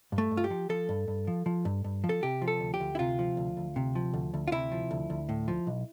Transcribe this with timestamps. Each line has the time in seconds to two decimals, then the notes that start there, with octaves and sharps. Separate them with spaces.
0.12 G2
0.18 A3
0.31 G2
0.37 F4
0.44 G4
0.50 F3
0.69 F3 A4
0.89 G2
1.08 G2
1.27 F3
1.46 F3
1.65 G2
1.84 G2
2.04 F3
2.09 A4
2.23 C3 G4
2.42 F3
2.48 A4
2.60 D2
2.74 G4
2.80 D2
2.95 E4
2.99 C3 F4
3.19 F3
3.37 D2
3.57 D2
3.76 C3
3.95 F3
4.13 D2
4.34 D2
4.48 F4
4.52 C3 E4
4.72 F3
4.91 D2
5.10 D2
5.29 A2
5.48 F3
5.67 B1